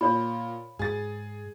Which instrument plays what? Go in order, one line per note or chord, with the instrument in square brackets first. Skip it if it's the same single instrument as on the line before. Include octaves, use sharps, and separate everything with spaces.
[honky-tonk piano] A#2 [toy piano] C#5 B5
[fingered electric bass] G#2 [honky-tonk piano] G#4 A6